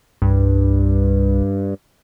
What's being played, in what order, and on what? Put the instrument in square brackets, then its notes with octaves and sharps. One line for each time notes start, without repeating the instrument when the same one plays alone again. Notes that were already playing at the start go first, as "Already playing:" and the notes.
[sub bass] C2 [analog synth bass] G2